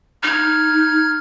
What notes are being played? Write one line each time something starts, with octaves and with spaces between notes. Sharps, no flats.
D#4 F6 G#6